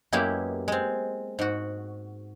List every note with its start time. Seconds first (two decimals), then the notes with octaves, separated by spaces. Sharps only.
0.12 F#2 G#3 A#3 B3 E4 G4
0.68 G#3 C4
1.39 G#2 F#4